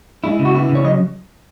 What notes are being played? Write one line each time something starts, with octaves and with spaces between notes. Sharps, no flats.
G#3 E4
C#3
F#4
B3 E4
C#3
C#5
F#3 D#5